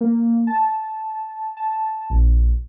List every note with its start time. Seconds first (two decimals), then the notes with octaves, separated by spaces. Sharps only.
0.01 A#3
0.47 A5
1.57 A5
2.10 A#1